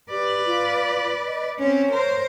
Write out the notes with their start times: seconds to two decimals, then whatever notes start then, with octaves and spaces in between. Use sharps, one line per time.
0.10 G4 B4 D5
0.46 F4
1.27 D#5
1.59 C4 C#4 C#5
1.91 A#4 C5